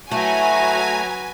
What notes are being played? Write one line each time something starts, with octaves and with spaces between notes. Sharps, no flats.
F#3 A3 E4 F#4 B4 G#5 A#5